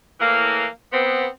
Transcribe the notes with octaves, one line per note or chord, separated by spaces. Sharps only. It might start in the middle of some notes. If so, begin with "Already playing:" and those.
A2 E3 A#3
B3 C4